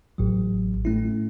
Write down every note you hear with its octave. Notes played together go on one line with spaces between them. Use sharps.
A1 A2 F#3
A2 A3 C#4 E4